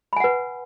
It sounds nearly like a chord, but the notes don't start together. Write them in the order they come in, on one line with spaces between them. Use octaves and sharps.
B5 G#5 F#5 B4